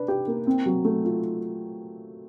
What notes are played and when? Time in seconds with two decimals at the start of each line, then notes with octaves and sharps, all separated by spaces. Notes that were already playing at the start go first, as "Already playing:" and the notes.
Already playing: D4 B4
0.08 G4
0.27 A#3
0.47 C4
0.66 F#3
0.85 A3
1.05 F4